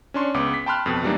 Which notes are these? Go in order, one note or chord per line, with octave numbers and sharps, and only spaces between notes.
C#4 D4 C6 C#6
C#2 B3 D6
B6
G5 A5 B5 C6 F6 F#6
F2 B2
E3 F#3 G3 A#3 D4 D#4